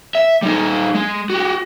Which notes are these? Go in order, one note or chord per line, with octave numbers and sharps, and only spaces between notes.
E5
G3 D#4
G#3
F#4 G4